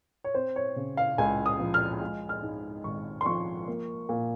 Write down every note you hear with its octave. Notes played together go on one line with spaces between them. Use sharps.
C#5
C4 C5
C#5
C#3
F5
C#2 G#5
D#6
F3
F6
G#3
F6
G#2
G#1 C#6
C6
F3 C#6
A#3
A#2